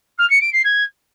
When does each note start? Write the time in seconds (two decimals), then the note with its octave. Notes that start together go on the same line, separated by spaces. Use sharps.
0.18 F6
0.29 C#7
0.41 D7
0.52 C7
0.64 G#6